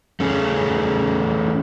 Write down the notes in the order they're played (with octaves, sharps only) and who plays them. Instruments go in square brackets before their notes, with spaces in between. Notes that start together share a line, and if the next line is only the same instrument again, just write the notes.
[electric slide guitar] A3 C#4 G#4